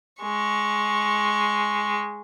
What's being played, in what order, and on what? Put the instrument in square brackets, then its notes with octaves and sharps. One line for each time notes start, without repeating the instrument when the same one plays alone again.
[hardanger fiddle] G#3 C#6